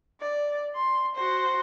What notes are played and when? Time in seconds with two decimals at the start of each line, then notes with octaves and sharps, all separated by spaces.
0.21 D5
0.76 C6
1.16 F#4 C5